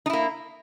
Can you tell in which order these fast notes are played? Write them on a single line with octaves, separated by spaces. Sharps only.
D#4 E4 A#3